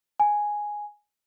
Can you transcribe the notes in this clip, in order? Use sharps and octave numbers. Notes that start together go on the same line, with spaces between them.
G#5